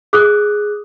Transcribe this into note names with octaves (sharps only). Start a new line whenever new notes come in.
G#4 D6 D#6 F#6